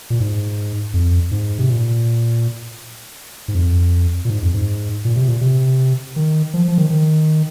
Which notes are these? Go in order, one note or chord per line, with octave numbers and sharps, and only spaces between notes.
A#2
G#2
F2
G#2
C3
A#2
G#2
F2
A#2
G#2
F2
G#2
A#2
C3
A#2
C3
D#3
F3
F3
D#3
D#3